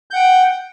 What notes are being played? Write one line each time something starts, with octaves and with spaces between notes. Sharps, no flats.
F#5 G5 G6